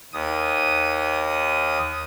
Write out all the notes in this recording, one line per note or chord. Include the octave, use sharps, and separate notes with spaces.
D#2 D#6